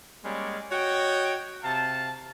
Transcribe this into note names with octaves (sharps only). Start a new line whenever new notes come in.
G3 G#3 A#3 C#4 D5
F#4 C#5 D#5 G5
C3 F5 A5